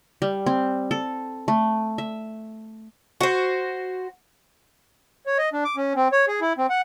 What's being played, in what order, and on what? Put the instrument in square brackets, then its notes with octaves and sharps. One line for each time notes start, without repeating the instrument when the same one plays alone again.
[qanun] G3
C4
A4
A3
E5
[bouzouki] F#4 C5
[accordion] C#5
D#5
D4
D6
C#4
C4
C#5
G#4
E4
C4
F#5